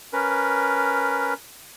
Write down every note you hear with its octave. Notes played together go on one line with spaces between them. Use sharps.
C#4 A#4 B4